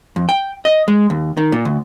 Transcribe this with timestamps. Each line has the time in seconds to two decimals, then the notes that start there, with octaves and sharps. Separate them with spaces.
0.16 F2
0.29 G5
0.65 D#5
0.88 G#3
1.10 D#2
1.37 D#3
1.52 A#2
1.65 D2